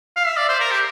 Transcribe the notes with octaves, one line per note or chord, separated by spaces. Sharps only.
F5
E5
D5
C5
A#4
G4